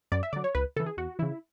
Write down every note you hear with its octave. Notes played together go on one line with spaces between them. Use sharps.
F#2 D5
E5
D3 F#3 D5
C#5
C#2 B4
C#3 E3 A4
G#4
E2 F#4
C#3 E3 E4